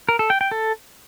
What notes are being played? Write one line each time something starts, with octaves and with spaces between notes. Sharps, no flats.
A#4
A4
G5
G5
A4